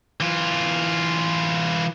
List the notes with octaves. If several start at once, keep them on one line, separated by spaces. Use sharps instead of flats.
E3 F4